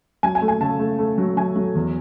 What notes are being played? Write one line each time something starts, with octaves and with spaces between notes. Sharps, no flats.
F#3 G#5
G#5
A3
G#5
C#3 A5
A3
A3
F#3
F#3 G#5
F#3
E2